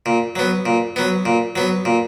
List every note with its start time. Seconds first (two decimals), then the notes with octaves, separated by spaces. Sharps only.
0.06 A#2
0.36 F#3 B3
0.66 A#2
0.96 F#3 B3
1.26 A#2
1.56 F#3 B3
1.85 A#2